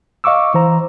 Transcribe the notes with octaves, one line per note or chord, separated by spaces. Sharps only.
D#5 F5 C#6 D6 E6
E3 C5 A#5